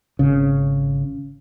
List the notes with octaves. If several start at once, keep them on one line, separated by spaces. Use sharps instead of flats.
G#1 C#3